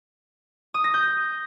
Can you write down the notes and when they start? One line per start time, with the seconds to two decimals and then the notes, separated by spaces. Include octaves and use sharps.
0.74 D#6
0.84 A#6
0.94 G6